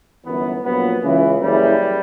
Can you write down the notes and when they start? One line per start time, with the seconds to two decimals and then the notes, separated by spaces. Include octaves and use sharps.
0.25 G1 F#2 E3 B3
0.64 A#1 A#2 F#3 B3
1.03 C#2 C#3 E3
1.42 F#1 F#2 C#3 E3 G3